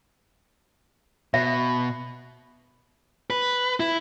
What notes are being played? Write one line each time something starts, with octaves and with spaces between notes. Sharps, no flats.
B2 E5
B4
E4